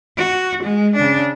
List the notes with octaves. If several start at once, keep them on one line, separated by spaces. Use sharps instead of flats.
F#4
G#3
C#3 D4